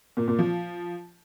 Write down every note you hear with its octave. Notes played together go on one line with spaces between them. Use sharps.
A#2
A#2
F3